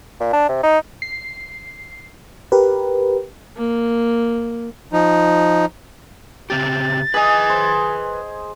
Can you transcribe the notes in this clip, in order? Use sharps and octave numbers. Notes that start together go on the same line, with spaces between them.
A#2
D4
C3
D#4
C7
G4 A#4 B4
A#3
F3 D#4
C#3 C4 G4 A6
G#4 B4 D#5 G#5
C5